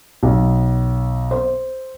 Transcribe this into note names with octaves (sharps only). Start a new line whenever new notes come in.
B1
C5